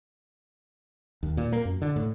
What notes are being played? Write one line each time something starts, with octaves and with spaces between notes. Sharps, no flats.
D#2
A#2
A#3
F#2
D3
A2